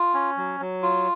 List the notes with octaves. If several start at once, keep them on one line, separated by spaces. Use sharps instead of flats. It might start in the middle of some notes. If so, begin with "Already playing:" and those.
Already playing: F4
C#4
F#3
F#3
F4